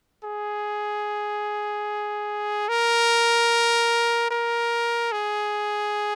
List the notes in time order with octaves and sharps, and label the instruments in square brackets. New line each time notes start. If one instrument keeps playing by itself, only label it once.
[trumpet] G#4
A#4
A#4
G#4